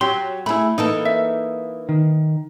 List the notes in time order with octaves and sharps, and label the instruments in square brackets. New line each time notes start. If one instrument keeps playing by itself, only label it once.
[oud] F#3 [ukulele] F#4 G4 [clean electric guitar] C6
[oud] A3 G#4 [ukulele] E4 B5
[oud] E3 A#3 A4 [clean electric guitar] D#4
[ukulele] E5
[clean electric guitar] D#3